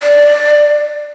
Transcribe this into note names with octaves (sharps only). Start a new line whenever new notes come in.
D5